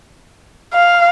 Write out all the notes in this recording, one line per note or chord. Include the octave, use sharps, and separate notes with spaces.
F5